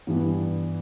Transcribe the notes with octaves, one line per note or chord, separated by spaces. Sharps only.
G2 E3 G3 B3